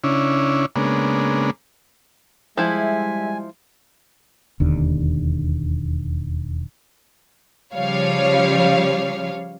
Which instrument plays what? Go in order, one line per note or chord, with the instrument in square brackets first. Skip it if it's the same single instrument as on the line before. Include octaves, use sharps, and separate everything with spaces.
[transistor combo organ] C#3 C#4 D4 E4
C#3 G#3 A#3 B3 D4
[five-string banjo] F3 E4 [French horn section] G3 G#3 [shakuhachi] E5 [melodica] G#5
[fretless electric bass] E1 D#2 D3
[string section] C#3 F3 G3 C#5 F5